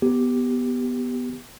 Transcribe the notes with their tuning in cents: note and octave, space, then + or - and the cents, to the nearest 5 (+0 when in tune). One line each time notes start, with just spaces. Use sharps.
B3 +0 G4 +0